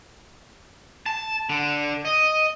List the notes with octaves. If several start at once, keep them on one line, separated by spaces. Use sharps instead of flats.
A5
D3
D#5